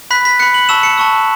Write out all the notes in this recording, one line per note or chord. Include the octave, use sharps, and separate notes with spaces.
B5 F#6 B6
B6
B5 F#6 C#7
F#7
A5 C#6 E6 E7
C#7
A5 C#6 E6